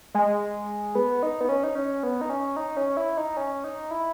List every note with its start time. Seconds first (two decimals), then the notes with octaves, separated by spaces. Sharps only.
0.14 G#3
0.95 B3
1.23 D#4
1.41 B3
1.49 C#4
1.64 D#4
1.75 C#4
2.03 B3
2.21 D#4
2.30 C#4
2.56 D#4
2.77 C#4
2.97 E4
3.17 D#4
3.37 C#4
3.64 D#4
3.91 E4